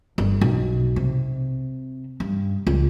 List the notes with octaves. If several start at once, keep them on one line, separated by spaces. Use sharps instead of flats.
G1
B1
C3
G2
C#2